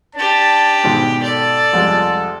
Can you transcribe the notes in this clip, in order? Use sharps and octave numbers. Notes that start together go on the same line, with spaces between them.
D4 G4 A5
G#2 B2 D#3
A4 D5
C2 F2 G#3